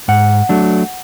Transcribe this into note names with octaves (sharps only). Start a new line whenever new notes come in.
G#2 F#5
F#3 A3 D4